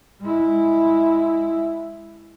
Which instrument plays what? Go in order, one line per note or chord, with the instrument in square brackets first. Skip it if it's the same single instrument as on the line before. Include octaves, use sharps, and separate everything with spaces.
[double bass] G#3 E4